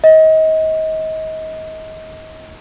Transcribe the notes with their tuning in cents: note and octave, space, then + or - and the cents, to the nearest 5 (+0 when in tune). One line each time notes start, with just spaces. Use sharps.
D#5 +30